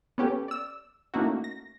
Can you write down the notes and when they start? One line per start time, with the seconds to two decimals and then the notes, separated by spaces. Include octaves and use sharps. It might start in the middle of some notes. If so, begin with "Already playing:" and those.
0.18 B3 C#4 G4 A4
0.48 D5 E6
1.14 A3 A#3 C#4 D#4 E4 F#4
1.44 A#6